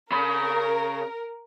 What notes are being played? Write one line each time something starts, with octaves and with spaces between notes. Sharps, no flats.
C#3 A#4 B5